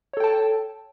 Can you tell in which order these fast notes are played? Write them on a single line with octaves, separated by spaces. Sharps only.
C#5 A4 G5 A5